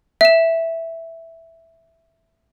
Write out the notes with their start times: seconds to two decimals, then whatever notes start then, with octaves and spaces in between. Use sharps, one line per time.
0.21 E5 E7